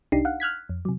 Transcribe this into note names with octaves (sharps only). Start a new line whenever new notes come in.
C2 D4 D#4 G4 C7
F5 F#5
F6 F#6 G#6 B6
F2
C3 F#3